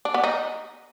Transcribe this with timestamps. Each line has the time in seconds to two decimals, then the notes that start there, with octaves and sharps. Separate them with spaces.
0.05 D4
0.14 B3
0.24 D#4